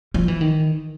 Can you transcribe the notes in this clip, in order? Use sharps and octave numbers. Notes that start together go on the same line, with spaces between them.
F3
E3
D#3